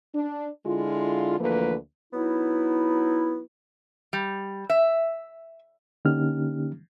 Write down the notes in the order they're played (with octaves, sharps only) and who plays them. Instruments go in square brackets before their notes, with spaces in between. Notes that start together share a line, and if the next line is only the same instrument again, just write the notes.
[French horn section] D4
D3 G#3 E4 F4
D2 E3 F3 A3 A#3 B4
[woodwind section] F#3 B3 D#4 E4
[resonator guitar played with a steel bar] G3
E5
[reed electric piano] D3 A#3 C#4 D#4 G4 F6